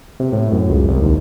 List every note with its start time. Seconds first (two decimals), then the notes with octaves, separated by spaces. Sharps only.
0.20 C3
0.32 A2
0.52 F#2
0.70 C#2
0.88 C2
1.02 D#2